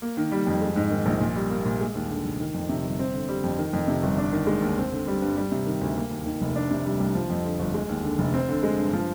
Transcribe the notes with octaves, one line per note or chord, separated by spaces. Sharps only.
A#3
D#3
G3
F2
G#3
G#2
D#3
A#1
A#2
G3
A#3
A#2
G#3
D#2
D3
F1
D#3
F2
C3
G1
C4
D3
G3
F2
D#3
F2
C3
G1
D4
D#3
G#3
D#2
C4
D3
G3
G2
G3
C3
D#3
D2
A#3
D#2
D#3
F1
D4
C3
G3
C2
F3
F2
D3
G1
G#3
D#2
D3
F1
C4
D3
G#3
G2
F3